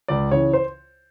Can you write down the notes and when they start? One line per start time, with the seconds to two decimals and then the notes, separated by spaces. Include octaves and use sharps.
0.08 C#2 D5
0.31 C#3 E3 C#5
0.53 C5